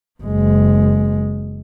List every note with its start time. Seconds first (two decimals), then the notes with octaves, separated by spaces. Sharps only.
0.22 F#1 G#3